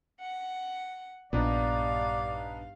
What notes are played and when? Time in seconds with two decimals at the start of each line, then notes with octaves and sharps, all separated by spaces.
0.20 F#5
1.33 A#1 G2 B3 D4 D#4 D5 F5